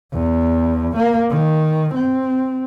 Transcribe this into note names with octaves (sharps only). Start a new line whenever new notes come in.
E2
A#3
D#3
C4